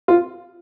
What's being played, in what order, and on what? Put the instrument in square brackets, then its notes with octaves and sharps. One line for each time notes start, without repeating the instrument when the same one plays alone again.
[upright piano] F4